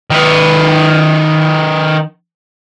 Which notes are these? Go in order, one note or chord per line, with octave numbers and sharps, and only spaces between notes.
D#3 B4